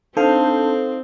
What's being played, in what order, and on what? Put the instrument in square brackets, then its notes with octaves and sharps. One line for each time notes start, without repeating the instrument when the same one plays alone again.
[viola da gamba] C4 [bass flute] D4 [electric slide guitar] D#4 C5 F5 [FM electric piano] A4